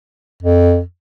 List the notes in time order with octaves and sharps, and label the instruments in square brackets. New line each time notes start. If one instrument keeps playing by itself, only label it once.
[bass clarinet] F2